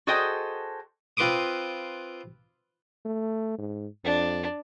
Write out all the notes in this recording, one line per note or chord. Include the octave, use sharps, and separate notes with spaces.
F#4 G#4 A4 C5 D#5 G5
C4 F4 B4 C6 D6 D#6
A3
G#2
F2 D4